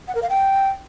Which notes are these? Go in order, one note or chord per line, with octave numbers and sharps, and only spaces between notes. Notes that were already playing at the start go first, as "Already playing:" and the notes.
F#5
A#4
F5
G5